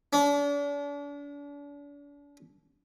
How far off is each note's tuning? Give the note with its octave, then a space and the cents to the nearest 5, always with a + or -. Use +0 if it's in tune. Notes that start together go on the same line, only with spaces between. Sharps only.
D4 -40